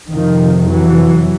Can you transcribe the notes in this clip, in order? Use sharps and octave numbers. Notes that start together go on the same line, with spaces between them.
F2 C3 D#3 F3
E3 F#3